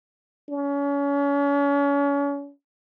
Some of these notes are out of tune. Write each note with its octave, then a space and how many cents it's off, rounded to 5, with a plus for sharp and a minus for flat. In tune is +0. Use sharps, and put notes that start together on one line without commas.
C#4 +35